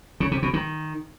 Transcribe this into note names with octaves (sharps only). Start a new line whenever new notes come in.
C#3
C3
B2
D#3